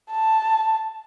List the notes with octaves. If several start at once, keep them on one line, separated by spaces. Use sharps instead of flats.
A5